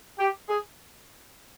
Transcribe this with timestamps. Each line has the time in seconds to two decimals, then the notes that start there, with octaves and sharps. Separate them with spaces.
0.19 G4
0.48 G#4